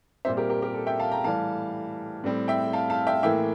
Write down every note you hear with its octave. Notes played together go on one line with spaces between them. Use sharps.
A#2 G3 C4 C5 E5
G4 A#4
G4 A#4
G4 A#4
A4
E5 G5
F5 A5
G5 A#5
A2 E3 G3 F5 A5
A2 G3 C4
E5 G5
F5 A5
F5 A5
E5 G5
A2 E3 A#3 E5 G5